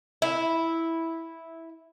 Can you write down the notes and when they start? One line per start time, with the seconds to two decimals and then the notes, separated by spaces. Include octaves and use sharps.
0.22 E4